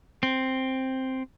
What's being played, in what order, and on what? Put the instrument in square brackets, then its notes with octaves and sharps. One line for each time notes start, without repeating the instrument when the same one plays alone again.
[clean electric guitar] C4